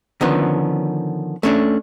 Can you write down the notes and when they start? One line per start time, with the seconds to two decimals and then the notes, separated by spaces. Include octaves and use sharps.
0.21 D3 D#3 F3 B3 C#4
1.43 A3 C#4 D4